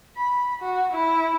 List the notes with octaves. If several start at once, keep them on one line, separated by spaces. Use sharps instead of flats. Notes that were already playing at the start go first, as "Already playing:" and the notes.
B5
F#4
E4